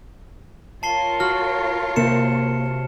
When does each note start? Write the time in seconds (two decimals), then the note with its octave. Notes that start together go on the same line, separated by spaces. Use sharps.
0.83 F4 A#4 C#5 A5 C7 G7
1.20 F#4 F6
1.96 C3 A#3 C#7 E7